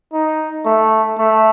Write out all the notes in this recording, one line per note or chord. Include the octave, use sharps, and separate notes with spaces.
D#4
A3
A3